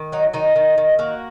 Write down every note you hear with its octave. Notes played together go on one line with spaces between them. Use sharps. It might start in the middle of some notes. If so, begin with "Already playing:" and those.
Already playing: D#3
F#3 D#4
D#3 D#4
D#3
D#3
A#3 F#4